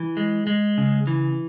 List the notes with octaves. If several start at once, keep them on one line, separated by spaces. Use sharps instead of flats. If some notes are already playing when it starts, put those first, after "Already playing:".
Already playing: E3
G#3
G#3
C#3
E3